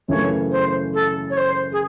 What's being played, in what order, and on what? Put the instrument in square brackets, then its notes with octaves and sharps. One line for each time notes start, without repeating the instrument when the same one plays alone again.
[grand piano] F#2 C#3 E3 A3 C#4 [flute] C#5
[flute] C5
A4
C#5
C5
G#4